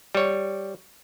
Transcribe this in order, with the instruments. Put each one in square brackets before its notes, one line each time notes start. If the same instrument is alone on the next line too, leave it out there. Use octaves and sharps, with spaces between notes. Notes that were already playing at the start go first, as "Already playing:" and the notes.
[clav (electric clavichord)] G3 C#5